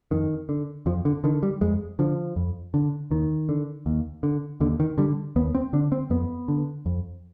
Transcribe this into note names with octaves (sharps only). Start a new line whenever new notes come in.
F2 D#3
D3
F2 F3
D3
D3 D#3
G3
F2 G#3
D3 F3
F2
D3
D#2 D#3
D3
D#2
D3
D#2 D3
D#3
D3 G3
D#2 B3
C4
D3 D4
C4
F2 B3
D3
F2